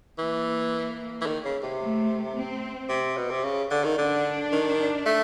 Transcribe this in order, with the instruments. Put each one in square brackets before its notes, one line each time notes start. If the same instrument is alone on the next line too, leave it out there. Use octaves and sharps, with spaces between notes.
[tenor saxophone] E3 [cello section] A#3
[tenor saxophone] E3
D#3
C#3
C3
[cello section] A3
C4
[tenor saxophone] C3
B2
C3
C#3
D3
D#3
[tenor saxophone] D3 [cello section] D4
[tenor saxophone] D#3
A3